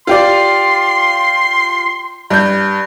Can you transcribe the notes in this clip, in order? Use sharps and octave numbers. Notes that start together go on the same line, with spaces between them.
F4 G4 D5 C6
G2 G6